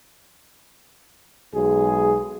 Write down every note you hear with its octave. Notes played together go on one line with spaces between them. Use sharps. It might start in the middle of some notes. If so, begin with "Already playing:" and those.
B1 G#3 G#4